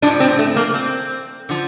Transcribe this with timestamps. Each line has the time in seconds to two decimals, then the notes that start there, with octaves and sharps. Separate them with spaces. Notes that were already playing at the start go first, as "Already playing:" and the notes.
0.02 A2 F3 D4
0.20 C4
0.39 A3
0.56 A#3
0.74 C4
1.49 D3 F3